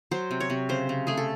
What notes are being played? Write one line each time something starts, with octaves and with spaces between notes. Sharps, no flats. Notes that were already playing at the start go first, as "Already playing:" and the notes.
F#3 C5
C3
C#5
C3
C#3 C5
C#3
A3 G#4
A4